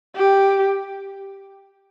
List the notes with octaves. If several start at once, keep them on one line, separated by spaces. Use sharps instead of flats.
G4